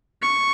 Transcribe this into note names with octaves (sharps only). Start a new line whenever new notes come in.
C#6